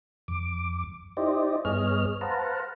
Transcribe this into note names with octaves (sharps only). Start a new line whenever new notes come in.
F2 D6
D#4 E4 G4 C5 D5 D#5
G2 B3 G#4 C#5 D#5 F6
B4 C5 F5 F#5 A5 A#5